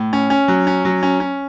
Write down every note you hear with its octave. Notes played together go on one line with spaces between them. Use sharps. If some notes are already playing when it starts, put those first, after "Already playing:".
Already playing: A2
C#4
C#4
F#3
C#4
F#3
C#4
C#4